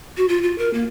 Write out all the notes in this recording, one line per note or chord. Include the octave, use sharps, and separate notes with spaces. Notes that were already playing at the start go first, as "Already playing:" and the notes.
F#4
F4
F4
A#4
A#3